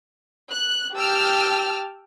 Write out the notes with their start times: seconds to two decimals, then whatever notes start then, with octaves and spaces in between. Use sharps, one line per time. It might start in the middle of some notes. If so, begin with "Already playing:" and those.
0.52 F#6
0.96 G4 G5 A5 E6 F6